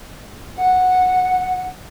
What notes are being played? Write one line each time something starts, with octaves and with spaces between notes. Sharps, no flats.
F#5